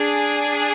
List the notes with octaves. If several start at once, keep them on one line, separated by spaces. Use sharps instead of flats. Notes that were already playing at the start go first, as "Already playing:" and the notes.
Already playing: D4 G#4